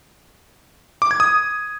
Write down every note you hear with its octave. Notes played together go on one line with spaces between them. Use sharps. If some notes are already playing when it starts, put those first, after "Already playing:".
D6
G#6
D#6